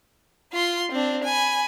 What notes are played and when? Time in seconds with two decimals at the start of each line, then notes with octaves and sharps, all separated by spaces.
0.52 F4 C6
0.91 C4 D4
1.24 G#5 B5